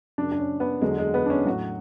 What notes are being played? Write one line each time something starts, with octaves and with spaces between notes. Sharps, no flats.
F#2 C#3 F#3 D4
D4
C#4
B3
E2 D3 F#3 G#3
G#3
B3
D4
C#4
A2 F#3 F#4